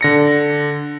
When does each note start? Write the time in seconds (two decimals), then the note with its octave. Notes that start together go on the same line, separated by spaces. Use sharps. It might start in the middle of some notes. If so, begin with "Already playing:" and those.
0.01 D3 A#6 C#7